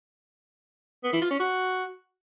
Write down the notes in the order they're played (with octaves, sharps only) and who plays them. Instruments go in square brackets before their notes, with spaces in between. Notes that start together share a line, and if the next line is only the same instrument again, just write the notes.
[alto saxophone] B3
E3
F4
C#4
F#4